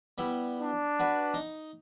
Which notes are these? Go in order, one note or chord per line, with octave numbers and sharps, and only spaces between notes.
G3 B3 E4
D4
F#4 B4 D5
D#4